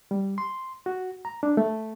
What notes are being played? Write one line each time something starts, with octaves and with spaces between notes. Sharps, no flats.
G3
C6
F#4
A#5
D4
A3